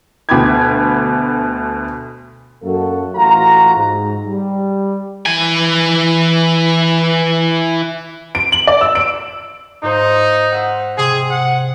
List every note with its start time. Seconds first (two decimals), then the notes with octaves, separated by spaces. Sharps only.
0.29 D2 B2 G5 B5 D6 G#6
2.63 F#2 A#3 F#4 A4
3.15 A1 F4 F#4 A#5
3.74 G#2
4.26 G3
5.26 E3 G#5
8.35 D7
8.52 F#7
8.67 D5
8.81 E6
8.95 D7
9.83 G#2 D#4 F4 C5
10.52 C5 E5 F#5
10.97 C3 G#4
11.30 F#5